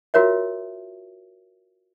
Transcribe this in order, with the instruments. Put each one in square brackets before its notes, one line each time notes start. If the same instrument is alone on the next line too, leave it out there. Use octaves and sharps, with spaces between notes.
[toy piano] F4 F#4 A#4 C#5 E5